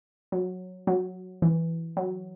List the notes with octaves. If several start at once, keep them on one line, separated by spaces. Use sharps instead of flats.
F#3
F#3
E3
F#3